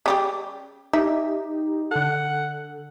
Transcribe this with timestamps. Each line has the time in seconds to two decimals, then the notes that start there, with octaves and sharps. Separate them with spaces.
0.06 C#3 G3 G4
0.93 D#4 G4 E5
1.91 D3 A4 F#5